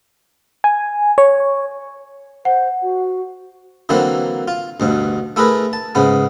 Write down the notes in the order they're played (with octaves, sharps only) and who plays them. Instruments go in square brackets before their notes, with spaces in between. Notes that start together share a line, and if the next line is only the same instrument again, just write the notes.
[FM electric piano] G#5
C#5
[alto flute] C5 [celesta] F#5
[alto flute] F#4
[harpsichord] D3 E3 F#3 A#3 C4
F4
D2 G2 B2
A3 E4 G#4 A#4 B4
A5
G#2 C#3 B3